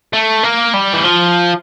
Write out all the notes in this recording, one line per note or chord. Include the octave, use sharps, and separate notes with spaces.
A3
A#3
G3
E3
F3